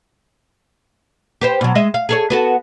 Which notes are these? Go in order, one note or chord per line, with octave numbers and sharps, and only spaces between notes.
G4 B4 C5
B2 F#3
G#3 D#5 E5
F5
G#4 A4 C#5
B3 F#4 A4